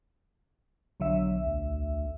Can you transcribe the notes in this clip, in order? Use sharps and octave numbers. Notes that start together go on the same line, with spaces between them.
B1 D3 F#3 E5
D2